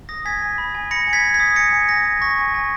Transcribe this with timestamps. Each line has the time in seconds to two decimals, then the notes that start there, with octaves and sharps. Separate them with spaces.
0.09 D#6 A#6
0.25 G#5 G#6 B6
0.42 G#5
0.58 B5
0.75 G#5
0.91 B5 A#6 C#7
1.07 G#5
1.13 G#6 B6
1.24 B5
1.34 G#6 B6
1.40 D#6
1.56 G#5 A#6 C#7
1.72 G#5
1.89 G#5 A#6
2.05 G#5
2.21 C#6 A#6
2.38 G#5
2.54 G#5